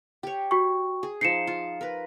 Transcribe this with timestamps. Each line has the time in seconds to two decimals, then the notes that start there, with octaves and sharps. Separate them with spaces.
0.23 G4 C#5
0.51 F#4 G5 C#6
1.03 G#4
1.21 F3 D#4 C7 C#7 E7
1.47 F4
1.81 A#4 B4